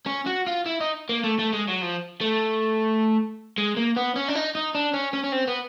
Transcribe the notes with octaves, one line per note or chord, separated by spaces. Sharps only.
C#4
F#4
F4
E4
D#4
A#3
A3
A3
G#3
F#3
F3
A3
G#3
A#3
B3
C#4
D4
D#4
D#4
D4
C#4
C#4
C#4
C4
B3